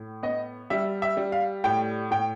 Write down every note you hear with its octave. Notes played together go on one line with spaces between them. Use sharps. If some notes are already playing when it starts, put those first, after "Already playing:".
Already playing: A2
B3 D#5
G3 E5
E5
G3
F5
A2 G5
A2 G5